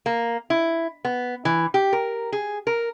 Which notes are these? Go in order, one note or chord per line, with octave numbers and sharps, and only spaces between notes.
A#3
E4
B3
E3
G4
A#4
G#4
A#4